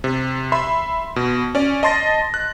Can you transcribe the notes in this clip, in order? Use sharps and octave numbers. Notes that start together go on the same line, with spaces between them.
C3
E5 B5 C6
B2
C#4 D5
D#5 A5 C6 A6 A#6
F#6